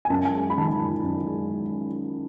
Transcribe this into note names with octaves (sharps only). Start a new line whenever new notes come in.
G#5
F#2 A5
G#5
G#3
B5
D#3 A5
B5
F#2
F#2
G#3